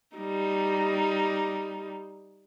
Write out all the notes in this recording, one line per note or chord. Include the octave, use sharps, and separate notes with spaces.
G3 D#4